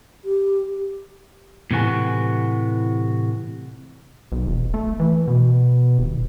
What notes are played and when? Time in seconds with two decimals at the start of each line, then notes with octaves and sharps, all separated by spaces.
0.24 G4
1.71 A2 C3 E3 F#4 G#5
4.32 B1
4.47 E1
4.74 A3
5.00 E3
5.28 B2
5.99 D#1